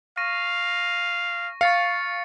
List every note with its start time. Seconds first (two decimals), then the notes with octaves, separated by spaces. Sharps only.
0.17 F5 C#6 A#6 D#7
1.61 F5 C#6 A6 C#7